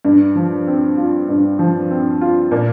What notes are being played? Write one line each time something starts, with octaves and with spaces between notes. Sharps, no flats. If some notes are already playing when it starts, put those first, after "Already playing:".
G2
F3
C4
F4
G2
F3
C4
F4
A#2